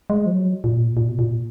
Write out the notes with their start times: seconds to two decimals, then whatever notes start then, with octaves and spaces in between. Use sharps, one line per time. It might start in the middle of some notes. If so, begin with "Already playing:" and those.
0.10 G#3
0.26 F3
0.31 F#3
0.64 A#2
0.97 A#2
1.08 B2
1.19 A#2